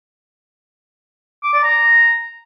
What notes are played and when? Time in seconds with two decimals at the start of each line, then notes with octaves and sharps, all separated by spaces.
1.44 D6
1.54 D5
1.64 A#5